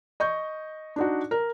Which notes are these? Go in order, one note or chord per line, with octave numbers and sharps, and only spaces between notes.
D#5 C#6 G6
D4 D#4 F#4
A#4